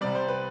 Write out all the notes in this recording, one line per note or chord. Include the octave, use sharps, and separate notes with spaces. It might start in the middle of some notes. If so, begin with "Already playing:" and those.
C2 C3 G3 D5
C5
B4